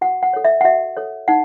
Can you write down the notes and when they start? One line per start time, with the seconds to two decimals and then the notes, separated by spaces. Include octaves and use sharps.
0.01 F#4 F#5
0.23 F#5
0.33 A4 C#5
0.45 E5
0.61 F#5
0.64 F#4 E5
0.97 A4 C#5
1.28 D#4 F#5